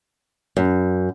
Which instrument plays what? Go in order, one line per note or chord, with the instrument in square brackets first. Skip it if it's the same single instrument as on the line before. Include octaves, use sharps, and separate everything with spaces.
[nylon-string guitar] F#2